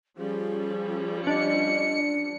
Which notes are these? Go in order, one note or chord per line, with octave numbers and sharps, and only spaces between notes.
F3 G3 C#4 G#4
D4 D#5 C#7